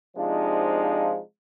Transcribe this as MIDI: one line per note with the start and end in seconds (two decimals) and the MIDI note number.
0.17 1.20 48
0.17 1.20 53
0.17 1.20 56
0.17 1.20 62
0.17 1.20 63
0.17 1.20 65